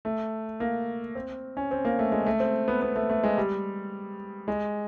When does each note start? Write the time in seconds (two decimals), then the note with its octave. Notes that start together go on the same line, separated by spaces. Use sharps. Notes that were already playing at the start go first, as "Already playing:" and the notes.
0.05 A3
0.60 A#3
1.15 C4
1.57 C#4
1.71 C4
1.85 A#3
1.99 A3
2.12 G#3
2.26 A3
2.40 C4
2.68 B3
2.82 B3
2.96 A3
3.10 A3
3.23 G#3
3.38 G3
4.48 G#3